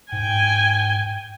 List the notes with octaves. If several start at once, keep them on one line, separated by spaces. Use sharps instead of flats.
G#2 G5 G#5